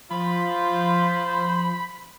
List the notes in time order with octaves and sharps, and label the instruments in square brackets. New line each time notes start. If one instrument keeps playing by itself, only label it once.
[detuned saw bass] F3 [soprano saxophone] F4 [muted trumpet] C5 [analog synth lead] B5